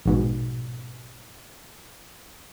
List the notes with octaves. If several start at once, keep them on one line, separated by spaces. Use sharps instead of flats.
A#1 G#2 B2